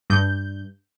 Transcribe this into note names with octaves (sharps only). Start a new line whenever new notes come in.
G2 G6